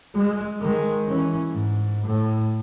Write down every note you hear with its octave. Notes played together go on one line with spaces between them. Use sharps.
G#3
D#3 G#3
E3 C#4
G#2
A2